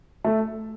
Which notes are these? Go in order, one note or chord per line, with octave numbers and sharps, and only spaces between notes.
A3